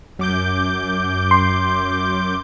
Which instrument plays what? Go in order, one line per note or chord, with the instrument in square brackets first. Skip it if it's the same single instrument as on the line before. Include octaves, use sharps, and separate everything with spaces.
[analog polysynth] F#2 D6 G6
[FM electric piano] C6